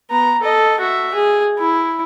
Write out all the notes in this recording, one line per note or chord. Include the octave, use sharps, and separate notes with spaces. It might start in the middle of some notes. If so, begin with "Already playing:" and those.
B3 A#5
A4 D#5
F#4 E5
G#4
E4